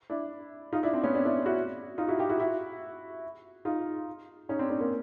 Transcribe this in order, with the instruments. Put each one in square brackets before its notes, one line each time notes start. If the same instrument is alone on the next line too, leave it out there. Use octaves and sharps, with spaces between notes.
[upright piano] D4 E4
D#4 F4
D4 E4
C4 D4
B3 C#4
C4 D4
D4 E4
E4 F#4
D#4 F4
E4 F#4
F4 G4
E4 F#4
E4 F#4
D#4 F4
C#4 D#4
C4 D4
C4 D4
A#3 C4